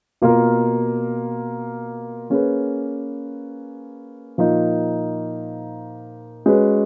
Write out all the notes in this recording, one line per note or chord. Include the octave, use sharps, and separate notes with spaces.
B2 A#3 F4 A#4
A#3 C#4 G#4 B4
A#2 F3 A#3 D#4
G#3 C#4 F#4 B4